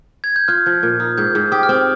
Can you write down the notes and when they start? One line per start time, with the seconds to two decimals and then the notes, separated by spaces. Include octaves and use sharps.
0.24 G#6
0.36 G6
0.48 F4 F6
0.66 F3
0.83 A#2
1.00 D#4
1.17 G#2 G6
1.35 G#2
1.52 G4 D#6
1.63 F6
1.69 C4 D#6